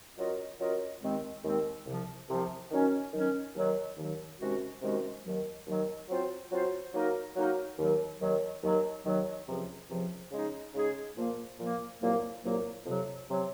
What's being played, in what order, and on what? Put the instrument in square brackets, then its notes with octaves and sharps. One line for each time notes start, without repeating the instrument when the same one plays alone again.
[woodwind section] F#3 C#4 F4 A#4 D#5
F#3 C#4 F4 A#4 D#5
D#2 D#3 G#3 C4
D#2 D#3 G#3 C4
C2 C3 F3
C2 C3 F3
D#3 F#3 C#4
D#3 F#3 C#4
D#2 D#3 F#3
D#2 D#3 F#3
C3 D#3 G#3 C#4 F#4
C3 D#3 G#3 C#4 F#4
D#2 D#3 F#3
D#2 D#3 F#3
F#3 C4 F4 C5
F#3 C4 F4 C5
F#3 A#3 D#4 A#4
F#3 A#3 D#4 A#4
D#2 D#3 F#3
D#2 D#3 F#3
D#2 D#3 F#3
D#2 D#3 F#3
C#2 C3 F3
C#2 C3 F3
C#3 G#3 D#4 G#4
C#3 G#3 D#4 G#4
A#2 F3 A#3
A#2 F3 A#3
C2 A#2 F#3 A#3
C2 A#2 F#3 A#3
F2 C3 F#3
C3 F#3